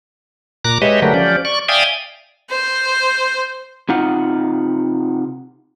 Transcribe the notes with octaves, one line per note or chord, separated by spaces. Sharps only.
A#2 A#5 D6 F#6
G#3 G4 B4 C#5 D#5 E5
D3 F#3 A3 G4 A#4 B4
F3 C#4 G4 D5
D5 C#6
D5 E5 F5 G5 G#5 D#6
C5
C3 D#4 F4 F#5